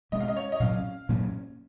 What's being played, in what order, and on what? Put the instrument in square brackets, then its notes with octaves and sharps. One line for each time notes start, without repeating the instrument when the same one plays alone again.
[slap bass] B2 G#3 C#4 [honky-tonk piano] D#5
[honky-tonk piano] F5
D#5
C#5
D#5
[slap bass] A#2 F#3 C#4 [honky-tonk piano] F5
[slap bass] A#2 F#3 A#3 C#4